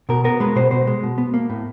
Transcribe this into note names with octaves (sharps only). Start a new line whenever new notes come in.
B2 A#4
B3 A#4
G#3 B4
B2 C5
B2 C5
G#3
B2
B3
A#3
A2